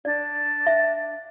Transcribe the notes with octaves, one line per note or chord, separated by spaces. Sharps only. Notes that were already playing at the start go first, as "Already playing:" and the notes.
D4 D5
E5